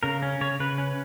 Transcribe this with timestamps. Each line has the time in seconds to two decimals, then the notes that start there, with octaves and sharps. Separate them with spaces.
0.03 C#3 A#4
0.22 C#4
0.41 C#3 C#5
0.60 C#3 B4
0.78 C#4